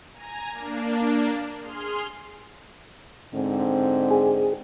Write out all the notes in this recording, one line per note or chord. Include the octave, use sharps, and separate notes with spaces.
G#5 A#5
A#3 D4
G#4 C6 F6
G#2 D3 C4
G#4